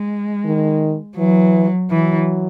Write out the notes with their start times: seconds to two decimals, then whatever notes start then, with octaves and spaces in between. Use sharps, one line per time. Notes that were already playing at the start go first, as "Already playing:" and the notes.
Already playing: G#3
0.45 D#3
1.17 E3 F#3
1.90 E3 F#3